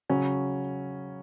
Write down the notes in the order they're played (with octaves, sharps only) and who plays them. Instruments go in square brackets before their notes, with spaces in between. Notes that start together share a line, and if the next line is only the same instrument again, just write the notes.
[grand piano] C#3 F#3 C#4